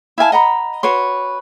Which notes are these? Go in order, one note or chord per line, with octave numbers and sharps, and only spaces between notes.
E4 F5 G#5 A5
D#5 F#5 A#5 B5
F#4 B4 C#5 C6